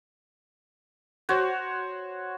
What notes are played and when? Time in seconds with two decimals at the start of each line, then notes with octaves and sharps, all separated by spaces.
1.29 F#4 C5 C#5